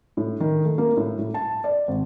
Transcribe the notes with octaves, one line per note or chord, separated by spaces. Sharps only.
A2
D#3
A3
A#3
A2
A2
A5
D5
G#1